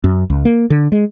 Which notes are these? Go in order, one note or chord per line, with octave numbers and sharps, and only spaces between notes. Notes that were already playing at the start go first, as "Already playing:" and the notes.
F#2
C#2
A#3
D3
G#3